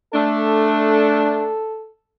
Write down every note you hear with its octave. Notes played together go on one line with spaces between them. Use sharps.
A3 D4 A4